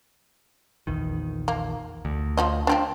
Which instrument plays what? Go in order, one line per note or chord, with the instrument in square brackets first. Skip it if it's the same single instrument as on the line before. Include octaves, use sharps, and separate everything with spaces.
[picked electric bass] A#1 E2 D#3
[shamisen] A#3
[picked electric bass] D2
[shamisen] F3 F4 D#5
F3 C4 D4